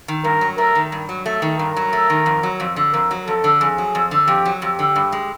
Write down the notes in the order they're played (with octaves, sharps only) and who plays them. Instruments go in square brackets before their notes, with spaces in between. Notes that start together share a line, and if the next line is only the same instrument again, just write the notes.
[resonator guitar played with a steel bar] D#3
[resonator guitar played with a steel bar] G2 [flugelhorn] A#4
[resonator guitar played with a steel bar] F#3
[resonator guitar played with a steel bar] A3 [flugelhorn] A#4
[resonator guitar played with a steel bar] D#3
G2
F#3
A3
D#3
[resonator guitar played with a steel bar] G2 [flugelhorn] A#4
[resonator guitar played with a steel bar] F#3
A3
D#3
F2
F#3
F2
D3
[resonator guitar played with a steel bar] F2 [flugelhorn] A#4
[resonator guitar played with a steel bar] F#3
[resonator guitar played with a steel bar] F2 [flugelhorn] A4
[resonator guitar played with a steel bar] D3
[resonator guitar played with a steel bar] F2 [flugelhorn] G#4
[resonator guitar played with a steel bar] F#3
F2
D3
[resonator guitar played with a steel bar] F2 [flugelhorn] G4
[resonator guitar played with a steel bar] F#3
[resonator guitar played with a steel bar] F2 [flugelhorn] G4
[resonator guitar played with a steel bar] D3
G2
G#3